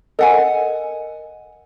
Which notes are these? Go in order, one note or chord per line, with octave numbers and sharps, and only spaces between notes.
A4 A#4 D#5 F#5 G#5